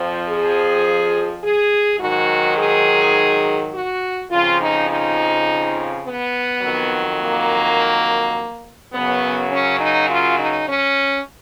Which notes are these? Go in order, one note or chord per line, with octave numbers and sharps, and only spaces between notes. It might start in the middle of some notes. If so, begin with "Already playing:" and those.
Already playing: F2 F3
G#4
G#4
G#2 D#3 F#3 F#4
G#4
F#4
F2 C#3 F3 F4
D#4
D#4
B3
F2 D#3 F#3
A#3
F#2 C#3 F#3 B3
C#4
D#4
F4
D#4
C#4